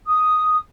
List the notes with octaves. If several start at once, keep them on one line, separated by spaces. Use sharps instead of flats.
D#6